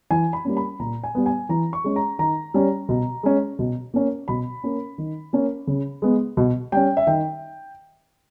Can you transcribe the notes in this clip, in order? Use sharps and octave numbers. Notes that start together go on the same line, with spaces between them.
E3 G#5
B5
G3 A#3 C#4
B5
A#2 A#5
G#5
G3 B3
G#5
E3 A#5
C#6
G#3 C#4
A#5
D#3 A#5
G3 C#4
B2
G#3 C#4
B2
A#3 C#4
B2 B5
A#3 C#4
D#3
A#3 C#4
C#3
G#3 B3
B2
G3 C#4 G5
E5
D#3 G5